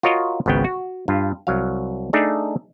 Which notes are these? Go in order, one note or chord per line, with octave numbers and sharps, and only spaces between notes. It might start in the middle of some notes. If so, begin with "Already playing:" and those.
F4 F#4 A#4 C#5 D#5
G#1 C#2 C#3 B3 G5
F#4
G2 F4
C2 F#3 F5
A3 D4 D#4 G#4 D5